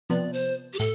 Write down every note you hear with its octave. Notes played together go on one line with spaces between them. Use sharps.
C3 F3 B3 D5
C5
G4
A2 A4